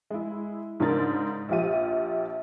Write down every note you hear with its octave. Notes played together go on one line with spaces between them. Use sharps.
G#3 E4
G#2 C#3 D4 A#4 A6
A#1 F3 F4 G4 D#7